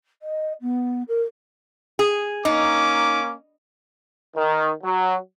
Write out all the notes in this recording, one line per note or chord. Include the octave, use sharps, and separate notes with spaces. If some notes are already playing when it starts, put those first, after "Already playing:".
D#5
B3
A#4
G#4
A#3 C#4 D#4 D6
D#3
F#3